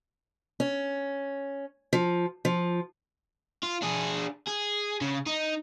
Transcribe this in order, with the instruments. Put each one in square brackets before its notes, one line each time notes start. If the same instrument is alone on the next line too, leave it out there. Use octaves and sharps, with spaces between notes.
[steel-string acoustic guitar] C#4
F3
F3
[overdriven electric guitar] F4
D4 G#4
G#4
C#3
D#4